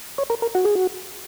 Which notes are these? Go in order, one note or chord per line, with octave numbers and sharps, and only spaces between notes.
C#5
A#4
A#4
F#4
G#4
F#4